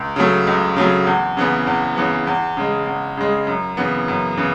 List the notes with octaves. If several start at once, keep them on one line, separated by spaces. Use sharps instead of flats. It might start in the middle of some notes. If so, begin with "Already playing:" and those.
Already playing: C#2
C#3 F#3 A3
C#2
C#3 F#3 A3
E2
C#3 E3 B3
E2
C#3 E3 B3
E2
C#3 G#3
E2
C#3 G#3
F#2
C#3 E3 B3
F#2
C#3 E3 B3